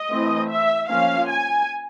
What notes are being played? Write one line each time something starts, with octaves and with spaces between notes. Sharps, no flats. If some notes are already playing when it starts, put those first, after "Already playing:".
Already playing: D#5
E3 A3 C4
E5
F3 A#3 C#4 F5
G#5